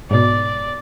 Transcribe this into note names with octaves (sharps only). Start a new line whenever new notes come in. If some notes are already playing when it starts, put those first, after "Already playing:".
G#2 B2 D5